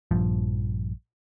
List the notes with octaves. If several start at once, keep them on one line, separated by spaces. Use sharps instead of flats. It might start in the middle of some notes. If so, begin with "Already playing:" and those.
A#1 G2 F3